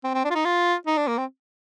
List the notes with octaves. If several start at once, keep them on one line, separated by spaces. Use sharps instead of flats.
C4
C4
D4
F4
D#4
F4
D#4
D4
A#3
C4